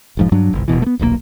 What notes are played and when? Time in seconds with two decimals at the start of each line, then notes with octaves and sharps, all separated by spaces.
0.17 E1 G#2 F3
0.32 G2 F#3 D4
0.53 G1 C2
0.68 D#1 A#1 B2 E3
0.82 A3 B3
0.99 D#1 B1 A#2 A#3